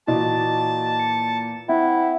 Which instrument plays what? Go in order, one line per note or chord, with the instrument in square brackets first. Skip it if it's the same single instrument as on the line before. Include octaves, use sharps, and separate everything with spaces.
[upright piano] A#2 E3 [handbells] F#4 D#5 [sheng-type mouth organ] A5
[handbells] C#7
[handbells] C4 F#5 [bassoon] E4